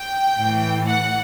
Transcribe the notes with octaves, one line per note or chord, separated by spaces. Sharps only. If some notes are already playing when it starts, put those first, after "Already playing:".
Already playing: G5
A2
E3
F#5